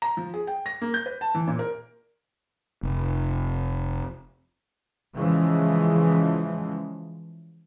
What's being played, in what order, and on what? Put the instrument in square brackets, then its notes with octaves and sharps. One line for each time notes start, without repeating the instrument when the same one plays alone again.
[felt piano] A#5
F3
G#4
G5
A#6
A#3
G6
B4
A5
E3
A#2
A#4
[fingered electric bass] F1
[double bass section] C#3 E3 F3 G#3